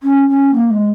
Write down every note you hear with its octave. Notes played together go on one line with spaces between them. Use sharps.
C#4
C#4
A#3
G#3